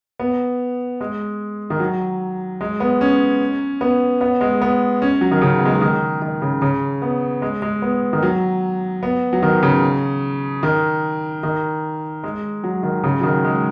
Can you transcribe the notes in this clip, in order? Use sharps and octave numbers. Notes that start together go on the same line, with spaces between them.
B3
G#3
D#3
F#3
G#3
B3
C#4
B3
B3
G#3
B3
C#4
F#3
D#3
C#3
B3
G#3
F#3
D#3
D#3
C#3
C#3
B3
G#3
G#3
B3
D#3
F#3
B3
F#3
D#3
C#3
D#3
D#3
G#3
F#3
D#3
C#3
F#3
D#3
G#3